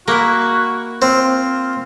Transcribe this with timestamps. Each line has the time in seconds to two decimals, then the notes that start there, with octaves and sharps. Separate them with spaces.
0.08 A#3 E4 F#4
1.02 C4 F4